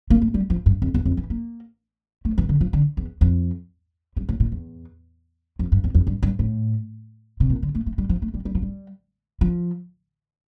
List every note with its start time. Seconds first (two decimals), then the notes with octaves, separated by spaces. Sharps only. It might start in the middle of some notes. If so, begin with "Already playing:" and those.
0.10 A#3
0.22 A3
0.34 G3
0.50 F3
0.66 G2
0.82 F2
0.94 E2
1.05 F2
1.17 E3
1.30 A#3
2.25 A3
2.38 E3
2.49 D3
2.61 F3
2.73 D3
2.97 E2
3.21 F2
4.16 G2
4.29 A2
4.40 A#2
4.52 E2
5.59 F2
5.72 G2
5.84 E2
5.95 F2
6.07 G2
6.23 G2
6.39 A2
7.40 C3
7.50 A#2
7.63 D3
7.75 A3
7.87 A3
7.98 G3
8.09 F3
8.22 A3
8.34 G3
8.45 G3
8.55 F3
8.62 G3
9.41 F3